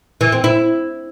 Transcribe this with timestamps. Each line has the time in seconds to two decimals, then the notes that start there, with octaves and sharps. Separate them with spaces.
0.21 E3
0.32 C4
0.44 E4